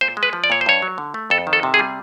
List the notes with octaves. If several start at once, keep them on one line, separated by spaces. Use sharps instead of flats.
A#2 C5
G#3
B4
F3
D5
A#2 C#5
C5
G2 C#5
F#3
D3
A3
F2 A4
D#3
A4
C3
G#4
G3